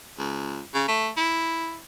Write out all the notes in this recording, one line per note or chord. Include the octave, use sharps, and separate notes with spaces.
C#2
C#3
A3
E4